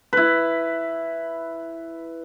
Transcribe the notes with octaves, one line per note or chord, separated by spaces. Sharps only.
E4 B4